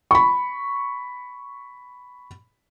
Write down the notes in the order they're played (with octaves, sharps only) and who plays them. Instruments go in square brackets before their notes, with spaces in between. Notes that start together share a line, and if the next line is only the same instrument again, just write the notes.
[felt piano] B5 C#6